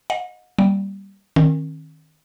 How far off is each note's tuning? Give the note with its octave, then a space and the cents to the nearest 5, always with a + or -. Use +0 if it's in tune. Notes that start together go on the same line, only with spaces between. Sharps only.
D#5 +0 F#5 -40
G3 +0 A#3 +10
D#3 +0 C#4 -45